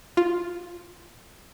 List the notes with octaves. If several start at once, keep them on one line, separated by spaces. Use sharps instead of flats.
F4